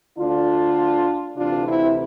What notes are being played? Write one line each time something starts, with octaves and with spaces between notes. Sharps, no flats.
D2 D3 D4 F4
D2 C3 E3 D4 F4
C4 E4